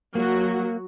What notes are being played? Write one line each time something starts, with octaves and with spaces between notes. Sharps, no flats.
F#3 A#3 F#4